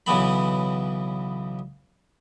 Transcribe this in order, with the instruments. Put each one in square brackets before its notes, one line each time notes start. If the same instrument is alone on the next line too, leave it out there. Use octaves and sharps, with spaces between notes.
[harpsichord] B1 C#3 E3 B3 B5